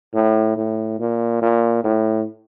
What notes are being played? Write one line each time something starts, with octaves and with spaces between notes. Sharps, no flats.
A2
A2
A#2
A#2
A2